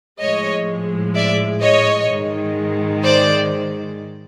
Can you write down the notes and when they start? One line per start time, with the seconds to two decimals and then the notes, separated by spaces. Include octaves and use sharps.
0.20 A2 F3 G#3 C#5 D#5
1.15 D5 E5
1.62 C#5 D#5
2.10 G#2 D#3 G#3
3.04 C5 D5